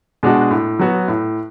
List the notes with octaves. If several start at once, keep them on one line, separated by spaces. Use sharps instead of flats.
B2 G#3 D4 F#4
A2
F#3 B3 F#4
A2